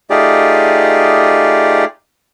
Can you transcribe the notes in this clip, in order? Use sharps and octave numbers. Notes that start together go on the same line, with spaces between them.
A3 D#4 F4 G4 G#4 D5